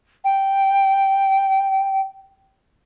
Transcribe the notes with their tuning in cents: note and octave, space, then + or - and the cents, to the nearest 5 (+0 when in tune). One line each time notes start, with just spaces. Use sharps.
G5 -5